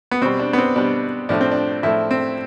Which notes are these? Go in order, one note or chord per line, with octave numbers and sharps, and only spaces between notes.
B3
B2 G3 C4
D4
B3
C4
B2 G3 D4
A2 F3 A3 D4
C4
D4
A2 F3 A3 E4
C4